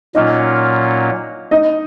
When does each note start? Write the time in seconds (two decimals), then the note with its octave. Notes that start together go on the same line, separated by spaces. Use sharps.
0.15 A#2 F#3 A#3 C#4 D#4 F4 D#5
1.51 D#4 D#5